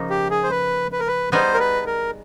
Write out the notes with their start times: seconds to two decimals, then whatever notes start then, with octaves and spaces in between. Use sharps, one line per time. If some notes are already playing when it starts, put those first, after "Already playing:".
Already playing: C#3 F3 A#3 D#4
0.10 G4
0.30 G#4
0.44 C5
0.51 B4
0.92 B4
1.00 A#4
1.08 B4
1.32 G3 B3 D#4 G#4 C5
1.54 A#4
1.60 B4
1.86 A#4